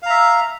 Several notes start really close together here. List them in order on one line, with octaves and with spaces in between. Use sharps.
F5 A#5 E5